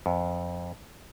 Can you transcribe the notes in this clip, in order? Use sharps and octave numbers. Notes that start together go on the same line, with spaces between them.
F2